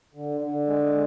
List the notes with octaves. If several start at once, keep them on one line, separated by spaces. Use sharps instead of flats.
D3
D3
G#3